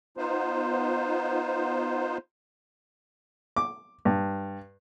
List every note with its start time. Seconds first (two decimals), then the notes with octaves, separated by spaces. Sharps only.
0.17 B3 D#4 F4 C5
3.56 D6
4.05 G2